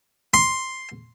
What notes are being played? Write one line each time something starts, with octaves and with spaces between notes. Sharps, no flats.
C6